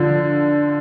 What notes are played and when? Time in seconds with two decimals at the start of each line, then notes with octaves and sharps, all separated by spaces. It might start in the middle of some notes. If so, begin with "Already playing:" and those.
Already playing: D3 F3